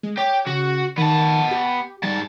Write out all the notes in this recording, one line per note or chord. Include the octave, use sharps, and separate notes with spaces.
G#3
G4 C#5
C#3 F#4
D#3 B3 A5
G4
G#2 G3 A5